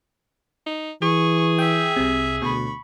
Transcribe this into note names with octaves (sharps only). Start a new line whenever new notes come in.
D#4
E3 G#4 C#6
E5 G5
C2 C3
D2 B2 B5 C#6